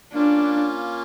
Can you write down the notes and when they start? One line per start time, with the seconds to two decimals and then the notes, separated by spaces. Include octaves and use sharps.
0.13 A#3 C#4 D4 F4